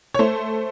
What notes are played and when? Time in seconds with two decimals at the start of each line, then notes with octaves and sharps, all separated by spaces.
0.14 C#5
0.19 A3 C5